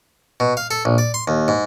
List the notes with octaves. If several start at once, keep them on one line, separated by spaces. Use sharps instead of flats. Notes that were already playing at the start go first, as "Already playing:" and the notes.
B2
F5
A4
A#1
D5
C6
D#2
G#2